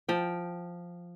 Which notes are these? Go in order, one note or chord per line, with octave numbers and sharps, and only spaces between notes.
F3 G5